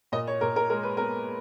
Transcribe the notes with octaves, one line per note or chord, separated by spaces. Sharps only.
A#2 D#5
C#5
A#2 A#4
A#4
G#3 A#4
B4
B3 A#4